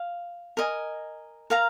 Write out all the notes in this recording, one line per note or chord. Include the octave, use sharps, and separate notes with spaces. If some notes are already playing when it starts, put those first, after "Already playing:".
Already playing: F5
A#4 D#5 G#5
A#4 F5 A#5